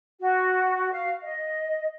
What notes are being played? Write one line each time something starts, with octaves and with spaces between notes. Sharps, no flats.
F#4
F5
D#5